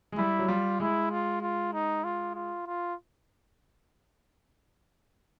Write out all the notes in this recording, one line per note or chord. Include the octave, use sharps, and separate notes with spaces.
G#3
G3 E4
F#3
G3 F4
G#3 E4
F4
F4
D#4
F4
F4
F4